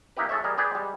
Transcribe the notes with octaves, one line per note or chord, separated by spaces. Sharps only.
A#3 D#4 E4 G4 B4
G#3 A4 C#5 E5
G3 G#4 A#4
G#4 B4 D5 G5
G3 G#3